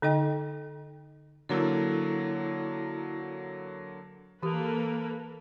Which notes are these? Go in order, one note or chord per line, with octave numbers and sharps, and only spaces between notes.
D3 D#4 D#5 G5
D3 F#3 A#3 E4 A4
E3 A#3 G4 A4 B4